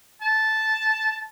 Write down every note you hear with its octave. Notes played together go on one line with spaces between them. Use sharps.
A5